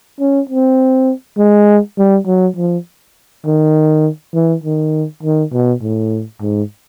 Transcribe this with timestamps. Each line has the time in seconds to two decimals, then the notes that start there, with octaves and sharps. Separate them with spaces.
0.20 C#4
0.49 C4
1.38 G#3
1.98 G3
2.27 F#3
2.57 F3
3.46 D#3
4.34 E3
4.64 D#3
5.23 D#3
5.53 B2
5.82 A2
6.42 G#2